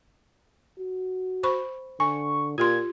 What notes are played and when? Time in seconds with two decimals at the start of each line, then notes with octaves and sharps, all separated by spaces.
0.79 F#4
1.43 C5 B5 C#6
2.00 D3 G#5 C#6
2.58 A#2 F4 G4 C6 G#6